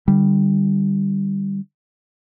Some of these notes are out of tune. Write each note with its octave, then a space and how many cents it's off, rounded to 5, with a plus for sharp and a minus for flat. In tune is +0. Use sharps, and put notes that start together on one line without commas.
D3 +30 G3 +0